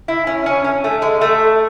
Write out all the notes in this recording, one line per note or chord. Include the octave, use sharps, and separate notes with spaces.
E4
C#4
C#4
C#4
A3
G#3
A3